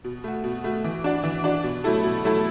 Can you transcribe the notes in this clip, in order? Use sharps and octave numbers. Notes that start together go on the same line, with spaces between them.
B2
A3 F#4
B2
A3 F#4
E3
D4 F#4 D5
E3
D4 F#4 D5
B2
F#3 A3 E4 A4
B2
F#3 A3 E4 A4